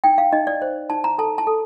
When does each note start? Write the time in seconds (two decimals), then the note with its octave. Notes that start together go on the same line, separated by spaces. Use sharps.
0.04 D#4 G5
0.18 F5
0.32 D#4 D#5
0.47 D5
0.62 C5
0.90 D#4 A5
1.04 A#5
1.18 A4 A5
1.38 A5
1.47 A4